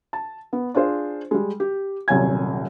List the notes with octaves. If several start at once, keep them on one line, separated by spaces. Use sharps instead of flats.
A5
B3
D4 F4 G#4 C5
G3 G#3
G4
D#1 C2 F#3 C#5 G#5 G#6